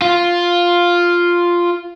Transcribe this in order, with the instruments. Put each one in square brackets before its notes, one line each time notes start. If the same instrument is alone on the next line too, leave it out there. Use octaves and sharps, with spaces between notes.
[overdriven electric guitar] F4